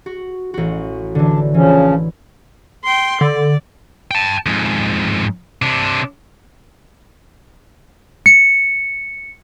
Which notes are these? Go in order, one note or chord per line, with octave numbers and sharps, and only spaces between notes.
F#4
A1 F#4
D3 E3 D4
C#3 E3 F3 C#4
G5 C6
D3 D5
G5 A5
F2 G#2
C3 D4
C#7